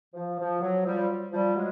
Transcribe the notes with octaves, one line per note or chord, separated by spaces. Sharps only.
F3
F3
F#3
F3 G3
F3 G3
F#3 G#3